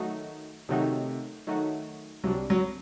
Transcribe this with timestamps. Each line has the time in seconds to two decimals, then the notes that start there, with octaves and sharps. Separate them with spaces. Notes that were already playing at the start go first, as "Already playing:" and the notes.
Already playing: D#3 F#3 A3 D#4 F#4
0.69 C3 D#3 F#3 A3 D#4 F#4
1.47 D#3 F#3 A3 D#4 F#4
2.24 C2 C3 F#3 G3 D4
2.50 F#3